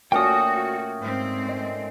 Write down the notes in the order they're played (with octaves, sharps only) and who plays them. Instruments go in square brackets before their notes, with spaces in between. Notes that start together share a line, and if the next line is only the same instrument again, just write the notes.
[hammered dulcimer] A#2 A3 C#4 [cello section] F#4 [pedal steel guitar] G5 D#6
[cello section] G#2 C4
[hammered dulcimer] D#5